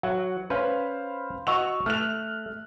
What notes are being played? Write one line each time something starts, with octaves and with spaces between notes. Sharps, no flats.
F#3 F#5
C#4 B4 C5 F5 B5
F#4 D#5 F#5 C#6 E6 F7
A3 F6 F#6 F7